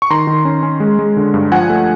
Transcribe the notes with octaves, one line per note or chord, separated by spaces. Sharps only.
C#6
D#3 A#5 C6
D#3
C#4
C#4
G#3
G#3
D3
G2
F3 F#5 G#5
A3